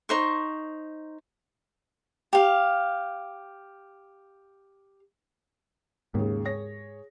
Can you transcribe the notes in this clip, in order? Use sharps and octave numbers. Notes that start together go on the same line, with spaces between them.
D#4 C5 C#6
G4 F5
D#2 G#2 C#3
G#4 C#5 A#6